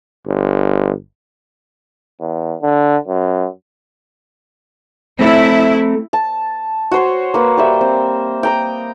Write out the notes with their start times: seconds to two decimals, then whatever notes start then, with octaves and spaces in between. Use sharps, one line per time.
0.27 G1
2.21 E2
2.62 D3
3.08 F#2
5.19 A3 C4 E4
6.13 A5
6.91 F#4 C5 C#5
7.34 A#3 B4
7.57 G3 C5 E5
7.81 C4
8.43 G5 A#5 D#6